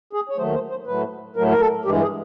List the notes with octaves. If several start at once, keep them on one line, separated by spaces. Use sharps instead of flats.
G#4
C#5
D#2 D#3 F#3 A3 C5
C5
C5
A2 F#3 A3 B4
A2 F#3 A3 A#4
A#4
A4
G2 E3 G#3 G4
G#4